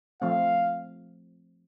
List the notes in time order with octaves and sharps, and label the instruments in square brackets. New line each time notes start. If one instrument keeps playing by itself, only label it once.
[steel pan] F3 A3 C4 [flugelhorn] F5